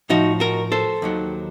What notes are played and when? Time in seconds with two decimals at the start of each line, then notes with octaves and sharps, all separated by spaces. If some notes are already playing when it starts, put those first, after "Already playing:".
0.09 A2 F3 D#4 F#4
0.40 F#4 A#4
0.72 A4 C5
1.02 D#2 D#3 F#3